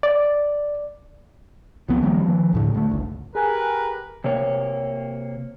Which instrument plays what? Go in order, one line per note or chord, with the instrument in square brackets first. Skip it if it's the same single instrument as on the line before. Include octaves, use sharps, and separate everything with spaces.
[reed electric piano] D5
[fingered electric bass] C2 F3 B3 C4
D#3 F3 G3 A#3
D#3 F3
D2 A2 D3
D2 A3
D1 G1 C#2
[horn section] G4 A#4 B4 [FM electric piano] G#4 G#5 F#6
[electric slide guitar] C3 A#3 C#5